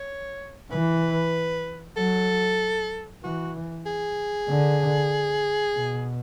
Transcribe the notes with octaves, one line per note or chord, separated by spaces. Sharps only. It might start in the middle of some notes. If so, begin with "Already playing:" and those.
Already playing: C#5
E3 B4
F#3 A4
E3 F#4
G#4
D3
B2